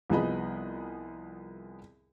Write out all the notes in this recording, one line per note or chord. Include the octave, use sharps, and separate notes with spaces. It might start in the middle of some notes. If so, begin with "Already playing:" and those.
C2 F3 B3 G#4 D#5 B5